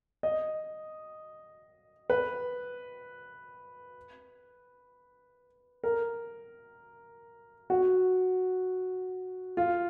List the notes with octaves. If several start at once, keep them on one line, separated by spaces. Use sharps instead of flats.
D#5
B4
A#4
F#4
F4